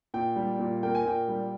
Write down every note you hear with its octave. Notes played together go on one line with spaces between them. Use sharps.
A#2 G5
G3
A#2
A#3 G5
G#5
A#2 G5
G3